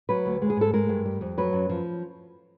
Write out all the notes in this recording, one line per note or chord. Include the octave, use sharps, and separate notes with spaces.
F#3 B4
D2
G#3
G#4
G#2 A4
G#3 A#4
G2
G3
F2
F#3 B4
F#2
F3